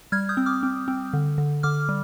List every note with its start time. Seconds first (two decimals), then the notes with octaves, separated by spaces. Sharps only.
0.12 G3 F6 G#6
0.29 D#6 G6
0.37 C4
0.46 D6 F6
0.63 C4
0.88 C4
1.13 D3
1.38 D3
1.63 D3 D6 F6
1.89 G3